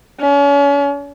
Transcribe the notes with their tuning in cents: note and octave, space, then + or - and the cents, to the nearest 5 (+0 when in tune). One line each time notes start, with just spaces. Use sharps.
C#4 +35